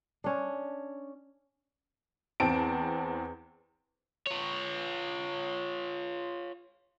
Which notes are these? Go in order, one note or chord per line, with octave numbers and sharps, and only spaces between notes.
C#4 D4
E2 C4 A5 D7
F4 C#5